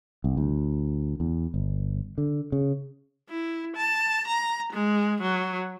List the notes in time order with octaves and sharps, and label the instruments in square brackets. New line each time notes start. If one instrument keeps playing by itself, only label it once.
[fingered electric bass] C2
D2
E2
G1
D3
C#3
[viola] E4
A5
A#5
G#3
F#3